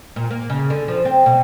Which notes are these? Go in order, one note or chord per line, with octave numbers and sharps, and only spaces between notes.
A#2
A#3
C#3
D3
F3
C4
B2